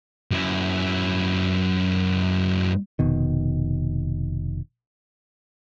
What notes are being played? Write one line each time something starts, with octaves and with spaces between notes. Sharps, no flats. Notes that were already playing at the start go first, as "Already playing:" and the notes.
F#2 E4
F1 B2 D#3